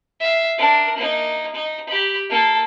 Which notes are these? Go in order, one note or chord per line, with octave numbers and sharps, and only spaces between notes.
E5 F5
D4 A#4
A#3 D#4
D#4
G4 B5
A#3 A4